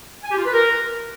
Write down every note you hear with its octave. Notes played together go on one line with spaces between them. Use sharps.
G#5
G4
F4
B4
A#4